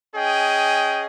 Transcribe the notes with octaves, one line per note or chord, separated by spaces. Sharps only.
C#4 G#4 D#5 G5